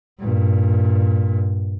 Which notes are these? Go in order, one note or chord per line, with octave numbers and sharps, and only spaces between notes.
G2 A#2